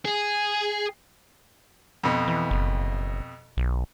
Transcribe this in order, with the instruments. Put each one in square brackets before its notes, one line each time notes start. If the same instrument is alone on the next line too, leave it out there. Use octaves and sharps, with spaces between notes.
[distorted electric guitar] G#4
[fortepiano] F2 B2
[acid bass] E3
F#1
B1